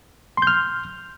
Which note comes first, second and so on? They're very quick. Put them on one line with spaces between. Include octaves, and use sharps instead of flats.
C6 G6 F6